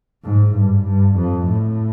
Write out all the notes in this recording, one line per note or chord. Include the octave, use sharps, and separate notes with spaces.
G#2
G2
G2
F2
A2